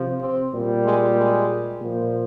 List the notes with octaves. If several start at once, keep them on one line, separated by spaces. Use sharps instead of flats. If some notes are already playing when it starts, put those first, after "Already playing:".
Already playing: C3 F3
C4
A#2 G3
G#3
G#3
A#2 F3